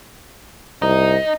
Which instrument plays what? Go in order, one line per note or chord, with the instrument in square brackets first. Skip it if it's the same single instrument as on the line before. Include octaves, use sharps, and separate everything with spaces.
[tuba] C2 [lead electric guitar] D#4